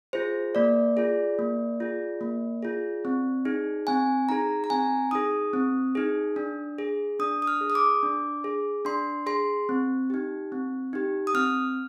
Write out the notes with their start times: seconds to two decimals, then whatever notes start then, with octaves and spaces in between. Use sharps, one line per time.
0.13 F4 G#4 C5
0.55 A#3 D5
0.97 F4 G#4
1.39 A#3
1.80 F4 G#4
2.21 A#3
2.62 F4 G#4
3.05 C4
3.45 D#4 G#4
3.87 C4 G#5
4.29 D#4 G#4 A#5
4.64 A#5
4.70 C4 G#5
5.11 D#4 G#4 D#6
5.53 C4
5.95 D#4 G#4
6.36 D4
6.78 G#4
7.19 D4 D#6
7.42 D#6
7.47 F6
7.61 G#4
7.70 D#6
7.75 D6
8.03 D4
8.44 G#4
8.85 D4 C6
9.26 G#4 C6
9.69 C4
10.10 D#4 G4
10.52 C4
10.93 D#4 G4
11.27 D#6
11.34 C4 F6